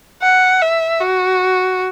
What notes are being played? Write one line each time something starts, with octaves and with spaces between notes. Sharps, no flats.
F#5
E5
F#4